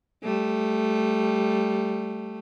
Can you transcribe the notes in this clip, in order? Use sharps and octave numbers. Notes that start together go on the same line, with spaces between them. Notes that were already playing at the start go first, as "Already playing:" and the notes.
G3 A3